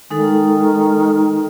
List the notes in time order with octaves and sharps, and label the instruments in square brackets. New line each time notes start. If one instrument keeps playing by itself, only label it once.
[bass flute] D#3 [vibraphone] G#3 D#4 A4